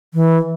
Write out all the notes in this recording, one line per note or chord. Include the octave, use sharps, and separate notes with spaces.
E3